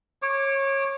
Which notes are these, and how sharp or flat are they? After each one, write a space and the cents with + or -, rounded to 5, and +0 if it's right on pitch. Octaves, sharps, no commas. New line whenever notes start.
C#5 -20 D6 +0